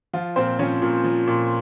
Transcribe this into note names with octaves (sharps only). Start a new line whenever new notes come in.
F3 F4
A#2 C4 C5
F3 C#4 C#5
A#2
F3
A#2